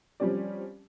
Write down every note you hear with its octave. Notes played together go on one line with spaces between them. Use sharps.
F3 G3 C4 C#4 G4 D5